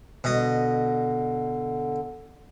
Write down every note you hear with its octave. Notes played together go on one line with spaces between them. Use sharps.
B2 D3 D#5